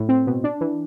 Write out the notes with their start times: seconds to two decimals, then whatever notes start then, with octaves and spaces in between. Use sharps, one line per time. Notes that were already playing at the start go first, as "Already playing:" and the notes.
Already playing: A2
0.09 C4
0.27 B2
0.44 D4
0.61 E3